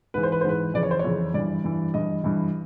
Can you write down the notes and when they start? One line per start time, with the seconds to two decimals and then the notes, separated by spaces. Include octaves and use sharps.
0.14 G#2 E3 B4
0.23 C5
0.32 B4
0.41 C5
0.45 G#2 E3 B4
0.74 F2 C#3 E3 D5
0.83 C#5
0.91 C5
0.99 C#5
1.04 F2 C#3 E3
1.34 G2 E3 D5
1.64 G2 E3
1.94 G2 E3 D#5
2.24 G2 E3